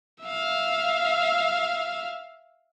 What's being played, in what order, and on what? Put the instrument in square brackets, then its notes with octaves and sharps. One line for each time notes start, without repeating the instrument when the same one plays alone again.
[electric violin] E5 F5